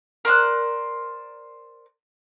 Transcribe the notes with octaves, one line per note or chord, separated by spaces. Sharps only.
A#4 C5 D5 F#6